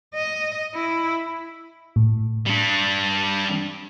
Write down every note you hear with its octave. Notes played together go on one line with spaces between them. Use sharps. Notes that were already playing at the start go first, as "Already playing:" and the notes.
D#5
E4
A2
G3 D4